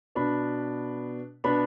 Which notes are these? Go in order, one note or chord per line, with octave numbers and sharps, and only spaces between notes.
B2 B3 D4 B5
B2 B3 D4 B5